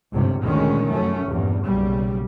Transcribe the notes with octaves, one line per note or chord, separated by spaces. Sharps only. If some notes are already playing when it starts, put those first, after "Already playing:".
G1 C#2 G#2 C3
D2 A#2 D#3 G#3 C#4
F1 F#2 A3 C#4
A#1 E2 G2
F#1 B1 C#3 G3